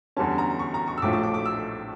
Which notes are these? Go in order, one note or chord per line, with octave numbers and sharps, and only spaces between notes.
E2 D3 G3 C#4 A5
A#5
C#6
A#5
C#6
E6
A#1 A2 F3 A3 D6
D6
D6
D6
E6